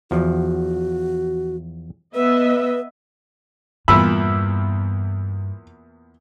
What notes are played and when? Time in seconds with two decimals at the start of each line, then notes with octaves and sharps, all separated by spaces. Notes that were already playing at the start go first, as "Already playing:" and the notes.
0.11 E2 F3 F#4
2.15 B3 B4 D#5 E5
3.88 E2 G2 A#2 B5 E6